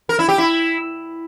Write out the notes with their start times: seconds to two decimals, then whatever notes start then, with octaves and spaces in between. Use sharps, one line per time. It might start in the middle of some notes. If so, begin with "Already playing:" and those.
0.09 A#4
0.19 E4
0.29 G4
0.38 E4